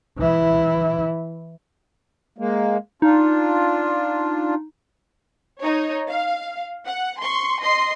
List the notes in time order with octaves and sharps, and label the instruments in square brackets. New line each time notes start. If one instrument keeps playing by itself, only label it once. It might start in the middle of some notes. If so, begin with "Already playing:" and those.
[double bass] E3 E4
[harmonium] G#3 A#3
[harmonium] D4 F4 [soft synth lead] D#4
[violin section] D#4 C#5
F5
F#5
C6 C#6
D#5 C6 C7